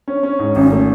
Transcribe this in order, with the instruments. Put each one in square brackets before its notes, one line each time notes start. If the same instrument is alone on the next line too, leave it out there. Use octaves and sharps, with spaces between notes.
[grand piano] C#4
C#4
G#2
[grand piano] G#1 [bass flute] C#4
[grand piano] A3